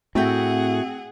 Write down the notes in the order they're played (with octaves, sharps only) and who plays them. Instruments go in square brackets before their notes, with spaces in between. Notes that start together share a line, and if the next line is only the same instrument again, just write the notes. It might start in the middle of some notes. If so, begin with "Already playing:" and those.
[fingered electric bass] A2 [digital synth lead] C4 [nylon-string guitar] F#4 E5 G5 [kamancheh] G#4 F#5